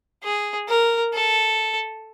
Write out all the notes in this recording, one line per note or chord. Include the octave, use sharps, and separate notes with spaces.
G#4
A#4
A4